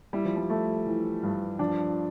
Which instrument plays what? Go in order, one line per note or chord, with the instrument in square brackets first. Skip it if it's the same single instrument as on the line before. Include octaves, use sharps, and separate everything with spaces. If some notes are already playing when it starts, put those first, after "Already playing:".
[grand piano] G3 [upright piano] E4
[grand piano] F3
G3
[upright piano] A3
E3
G2
[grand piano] F3 [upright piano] D4